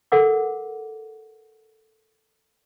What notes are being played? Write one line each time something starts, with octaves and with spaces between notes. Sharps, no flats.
A4 A#4 F#5 D6